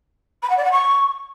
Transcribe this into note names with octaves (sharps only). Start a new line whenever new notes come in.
B5
F#5
D5
F#5
C#6